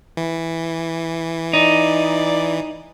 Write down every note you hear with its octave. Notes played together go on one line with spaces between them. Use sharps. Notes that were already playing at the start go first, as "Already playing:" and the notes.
E3
D#4 D5